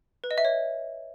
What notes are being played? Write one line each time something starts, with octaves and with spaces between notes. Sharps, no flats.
B4
D#5
E5
C#5